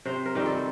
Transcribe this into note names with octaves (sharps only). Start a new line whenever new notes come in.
C3 C5
A#4
D#3 G3 C4
A4